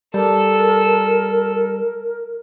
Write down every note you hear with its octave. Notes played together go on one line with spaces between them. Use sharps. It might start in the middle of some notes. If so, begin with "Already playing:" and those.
G3 A4 A#4